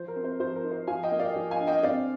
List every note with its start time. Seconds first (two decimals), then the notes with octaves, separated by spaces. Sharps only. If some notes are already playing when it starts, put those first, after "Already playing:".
Already playing: F3 C5
0.08 A#4
0.16 C4
0.24 C5
0.40 F3 C5
0.56 A#4
0.64 D#4
0.71 C5
0.87 F3 F5 G#5
1.03 D#5 G5
1.12 A#3
1.19 D5 F5
1.36 F3
1.51 F5 G#5
1.59 D4
1.67 D#5 G5
1.83 C4 D5 F5